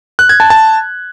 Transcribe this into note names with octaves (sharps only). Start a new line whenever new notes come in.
F#6
G#6
A5
A5